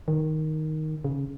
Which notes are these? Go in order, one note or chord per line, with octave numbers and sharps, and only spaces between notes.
D#3
C#3